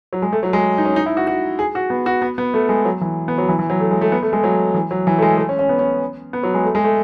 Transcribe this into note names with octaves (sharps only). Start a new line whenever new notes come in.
F#3
G#3
A3
F#3
G#3
D#4
C#4
D#4
E4
F#4
F#4
G#4
F#4
B3
F#4
B3
B3
A3
G#3
F#3
E3
B3
F#3
E3
E3
F#3
A3
G#3
A3
B3
A3
G#3
F#3
E3
F#3
E3
A3
G#3
A3
C#4
C#4
B3
C#4
B3
F#3
G#3
A3
G#3
A3